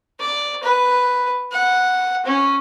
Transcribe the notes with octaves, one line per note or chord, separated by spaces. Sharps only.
D5
B4
F#5
C#4